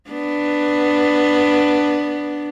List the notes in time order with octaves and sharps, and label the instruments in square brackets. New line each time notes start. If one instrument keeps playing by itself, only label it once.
[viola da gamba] B3 D4